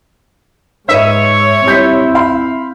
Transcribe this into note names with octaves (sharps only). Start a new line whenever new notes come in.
G#2 D#4 B4 C#5 E5 D#7
G3 C4 E4 G6 B6
F5 B5 C6